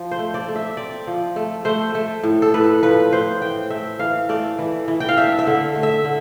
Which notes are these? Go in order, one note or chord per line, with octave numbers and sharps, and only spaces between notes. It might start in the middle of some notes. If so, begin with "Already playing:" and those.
Already playing: F3
C5
A3
D5
A3
E5
C4 D5
F3
A3
A3 C5
A3
A2
A4
A2 B4
F3 B4
A2 C5
E3 G5
A3 E5
E3 F5
A3 D5
E3
E3
G5
F5
D4 E5
E5
D3
A3
E5
D3